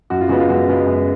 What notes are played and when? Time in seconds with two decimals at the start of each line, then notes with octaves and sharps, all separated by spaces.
0.10 F#2 F#4
0.21 F4
0.29 C#3 G#3 B3 F#4
0.40 F4
0.49 F#2 F#4
0.68 C#3 G#3 B3
0.86 F#2